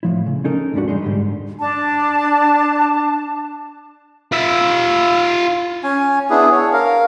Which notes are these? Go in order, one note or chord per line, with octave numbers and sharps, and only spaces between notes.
A2 F3 E4
C#3
C#4 D#4 A4 A#4
D2 G#2 D3 G3 D4 F#4
E2 G3 G#3 D#4 C6
G#2 D3 G3
D4 A5
F4 E5
C#4 G#5
B3 D4 E4 G#4
C#5
A#4 F5